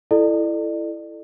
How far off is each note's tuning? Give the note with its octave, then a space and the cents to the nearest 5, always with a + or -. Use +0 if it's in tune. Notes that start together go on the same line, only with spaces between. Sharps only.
E4 +15 A4 +0 D5 +35